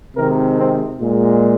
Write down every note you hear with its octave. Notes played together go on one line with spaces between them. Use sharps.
C3 D#3 G#3 A#4
C4
A#2 G#3